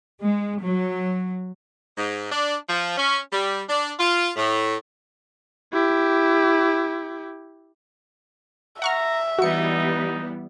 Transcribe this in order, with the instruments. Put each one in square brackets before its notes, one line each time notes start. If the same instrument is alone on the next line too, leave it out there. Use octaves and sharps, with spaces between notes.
[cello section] G#3
F#3
[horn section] G#2
D4
F3
C#4
G3
D4
F4
A2
[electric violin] E4 G4
[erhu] E5 [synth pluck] F#5 C#6 F6 [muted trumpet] A#5
[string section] E3 G3 B3 [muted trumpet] D#4 [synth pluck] F#4 C#7